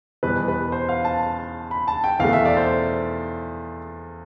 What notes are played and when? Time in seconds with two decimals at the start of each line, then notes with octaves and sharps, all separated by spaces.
0.23 E2 B2 G3 B4
0.48 B4
0.72 C5
0.89 F5
1.05 A5
1.71 B5
1.88 A5
2.04 G5
2.20 E2 B2 A3 F5
2.33 E5
2.45 D5
2.57 C5